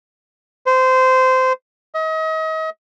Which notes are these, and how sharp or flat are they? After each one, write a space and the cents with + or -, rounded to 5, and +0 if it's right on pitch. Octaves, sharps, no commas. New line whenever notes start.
C5 -20
D#5 +35